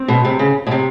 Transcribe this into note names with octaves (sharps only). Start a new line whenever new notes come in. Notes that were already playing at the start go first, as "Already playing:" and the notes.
Already playing: C4
B2
C3
C#3
B2
C3